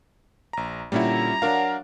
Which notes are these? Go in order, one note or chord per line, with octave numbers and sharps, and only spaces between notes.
A#1 A#5
A#2 D3 G3 C#4 E4 A#5
F#3 D4 F#4 A#4 F5